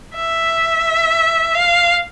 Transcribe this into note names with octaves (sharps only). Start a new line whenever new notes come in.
E5
F5